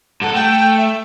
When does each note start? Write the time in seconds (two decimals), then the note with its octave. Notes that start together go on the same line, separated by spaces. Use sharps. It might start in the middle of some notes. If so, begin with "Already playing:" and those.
0.21 G2 A4 F#5
0.34 A3 G5
0.77 E5